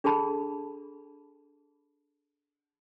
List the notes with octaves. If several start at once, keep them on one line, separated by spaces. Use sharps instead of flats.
D4 G#4 A4 A5 B5